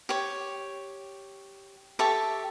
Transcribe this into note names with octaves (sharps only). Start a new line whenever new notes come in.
G4 C#5
G4 A4 E5 C#6